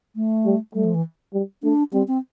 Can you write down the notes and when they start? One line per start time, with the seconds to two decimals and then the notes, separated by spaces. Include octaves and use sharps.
0.16 A3
0.46 G3
0.74 G3 A3
0.85 F3
0.94 E3
1.33 G3
1.63 A3 D4
1.93 G3 C4
2.08 C4